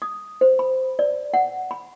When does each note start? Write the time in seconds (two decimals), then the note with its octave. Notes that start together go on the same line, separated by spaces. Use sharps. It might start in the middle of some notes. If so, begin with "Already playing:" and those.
0.02 D#6
0.41 C5
0.59 B5
0.99 D5
1.34 F#5
1.71 B5